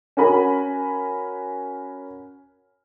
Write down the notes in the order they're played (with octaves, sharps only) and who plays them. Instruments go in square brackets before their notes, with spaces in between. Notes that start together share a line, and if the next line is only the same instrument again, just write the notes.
[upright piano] C#4 F#4 A#4 G#5 B5